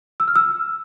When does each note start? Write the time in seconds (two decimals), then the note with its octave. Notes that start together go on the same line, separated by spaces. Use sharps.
0.20 E6
0.28 F6
0.36 E6